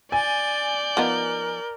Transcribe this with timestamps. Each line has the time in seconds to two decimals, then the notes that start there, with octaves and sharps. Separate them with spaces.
0.12 D5 G#5 G6 A6
0.97 F3 B3 D#4 A#4